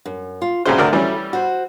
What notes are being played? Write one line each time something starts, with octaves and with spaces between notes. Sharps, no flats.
F#2
F4
C2 C#3 F#4 A4 C5 E5
D2 D4 A#4
E3 G3 C#4
F#4 C5